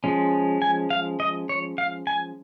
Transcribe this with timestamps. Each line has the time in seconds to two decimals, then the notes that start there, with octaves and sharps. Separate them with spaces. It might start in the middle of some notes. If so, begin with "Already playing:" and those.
0.04 F3 G#3 C#4
0.62 G#5
0.90 F5
1.20 D#5
1.49 C#5
1.78 F5
2.07 G#5